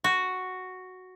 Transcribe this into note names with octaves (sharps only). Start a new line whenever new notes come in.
F#4